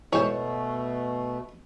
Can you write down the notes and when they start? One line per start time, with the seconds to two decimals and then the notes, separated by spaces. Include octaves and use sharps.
0.13 G#2 B2 E3 A3 C5 C#5